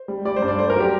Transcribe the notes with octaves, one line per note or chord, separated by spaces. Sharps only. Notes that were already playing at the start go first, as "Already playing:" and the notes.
Already playing: C5
G3
G3 D5
C5
G2
D5
A3 C5
A#4
F#3
G4